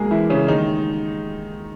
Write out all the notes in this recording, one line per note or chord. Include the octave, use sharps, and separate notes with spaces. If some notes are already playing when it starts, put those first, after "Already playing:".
Already playing: C#2 B2 F#3 G#3 A#3 G#4 A#4
E3 E4
C#3 C#4
D#2 D#3 G#3 D#4